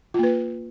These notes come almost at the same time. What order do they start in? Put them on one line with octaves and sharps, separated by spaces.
F4 A#3 B4